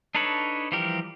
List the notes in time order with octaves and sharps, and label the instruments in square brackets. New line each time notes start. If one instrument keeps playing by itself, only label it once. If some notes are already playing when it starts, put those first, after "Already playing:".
[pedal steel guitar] D4 D#4 A4 B4 C#5
E3 F3 G3 G4 A#4